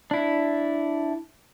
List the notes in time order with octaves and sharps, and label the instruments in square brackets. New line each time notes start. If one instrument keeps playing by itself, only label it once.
[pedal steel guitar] D4 E4